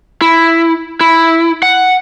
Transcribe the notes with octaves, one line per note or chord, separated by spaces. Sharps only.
E4
E4
F#5